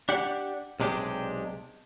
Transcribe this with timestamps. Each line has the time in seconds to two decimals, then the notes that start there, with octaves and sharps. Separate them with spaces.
0.09 D4 G4 F#5
0.80 B1 C3 G#3 D4 G4